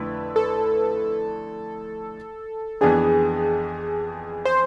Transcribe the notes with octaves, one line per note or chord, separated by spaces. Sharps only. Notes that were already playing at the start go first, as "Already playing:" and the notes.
Already playing: F2 D3 A3 E4 B4
A4
F2 E3 B3 D4 G#4
C5